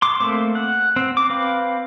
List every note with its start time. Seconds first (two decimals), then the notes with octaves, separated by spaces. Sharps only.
0.02 C6 D6
0.20 A3 A#3 C4
0.55 F#5
0.96 C4
1.17 D6
1.30 C4 B4 F5